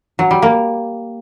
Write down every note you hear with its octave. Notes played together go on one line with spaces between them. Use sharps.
F#3
G3
A#3